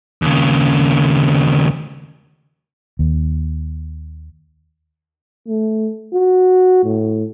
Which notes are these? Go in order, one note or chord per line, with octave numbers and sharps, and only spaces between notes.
D#2 C#3
D#2
A3
F#4
A2